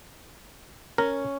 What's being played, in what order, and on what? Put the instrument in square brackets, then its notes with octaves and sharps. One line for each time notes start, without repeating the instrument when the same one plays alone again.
[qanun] C#4 [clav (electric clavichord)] A#4